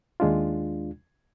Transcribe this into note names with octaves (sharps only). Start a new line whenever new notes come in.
D#2 G#3 D4 F4